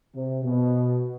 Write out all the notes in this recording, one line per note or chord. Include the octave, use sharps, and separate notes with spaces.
C3
B2